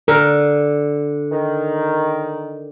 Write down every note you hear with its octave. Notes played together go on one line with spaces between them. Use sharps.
D3 A#4
D#3